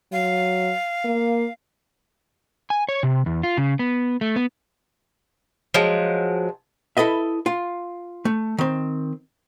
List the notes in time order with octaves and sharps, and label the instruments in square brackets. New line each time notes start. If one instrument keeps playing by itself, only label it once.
[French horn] F#3 [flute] F5
[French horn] A#3
[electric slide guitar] G#5
C#5
C3
E2
F4
C#3
B3
A3
B3
[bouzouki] F3 F#3 G#3
[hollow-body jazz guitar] E4 A4 B4 D#5 E5
F4
A3
D#3 C4